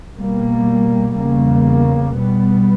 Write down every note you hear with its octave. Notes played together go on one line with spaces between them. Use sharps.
B2 G3 A#3
E2 C#3 G3 A#3
B2 G3 B3